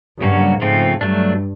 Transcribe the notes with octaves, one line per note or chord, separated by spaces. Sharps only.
G2 C#3 F#3 A#3 C#4 F#4
G#2 C#3 F3 A3 C4 F4
G2 F#3 A3 D4